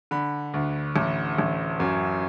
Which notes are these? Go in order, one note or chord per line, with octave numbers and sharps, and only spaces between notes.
D3 B5
D2
A1
A1
F#2